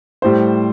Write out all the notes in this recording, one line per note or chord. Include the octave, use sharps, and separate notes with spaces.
A2 G3 C5